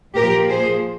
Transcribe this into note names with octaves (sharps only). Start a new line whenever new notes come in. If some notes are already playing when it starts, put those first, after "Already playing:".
A#2 F3 A#3 G4 A#4
G#4 C5